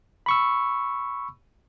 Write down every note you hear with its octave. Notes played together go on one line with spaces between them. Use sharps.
B5 C#6 E6